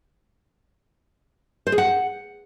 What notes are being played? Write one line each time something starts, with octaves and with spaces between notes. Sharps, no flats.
C5
G#4
F#5